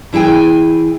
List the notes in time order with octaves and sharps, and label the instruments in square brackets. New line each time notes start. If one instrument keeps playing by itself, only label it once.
[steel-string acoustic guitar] E3 E4 G#4 G5 G#5